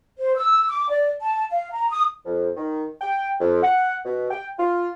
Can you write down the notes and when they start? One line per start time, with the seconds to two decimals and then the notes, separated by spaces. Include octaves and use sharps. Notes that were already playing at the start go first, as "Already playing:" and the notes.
0.19 C5
0.36 E6
0.69 D6
0.89 D5
1.20 A5
1.51 F5
1.72 A#5
1.90 D#6
2.26 F2
2.57 D#3
3.01 G5
3.40 F2
3.63 F#5
4.05 B2
4.31 G5
4.58 F4